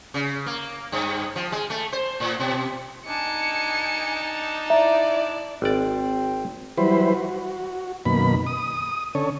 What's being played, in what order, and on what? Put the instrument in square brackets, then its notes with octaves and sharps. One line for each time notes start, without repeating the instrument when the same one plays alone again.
[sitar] C#3
A#3
G2
F3
G#3
A3
C5
A2
B2
[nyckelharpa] D4 A5 [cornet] D#4 [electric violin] G#5 C#7
[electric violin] E4 D5 [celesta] E5 A#5
[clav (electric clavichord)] G#1 D5 [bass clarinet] C4
[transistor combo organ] E3 F#3 G3 E4 B4 C5
F#4
F#2 B2 D#3 A#3 B5
D#6
D3 C#4 A4 C#5